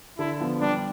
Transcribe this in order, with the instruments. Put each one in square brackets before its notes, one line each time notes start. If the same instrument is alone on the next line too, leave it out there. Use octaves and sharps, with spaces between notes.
[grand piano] D3 [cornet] E4
[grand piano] F3 B3
[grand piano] G3 [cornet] D4